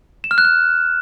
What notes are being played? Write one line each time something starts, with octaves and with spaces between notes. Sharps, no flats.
E7
F6
F#6
F6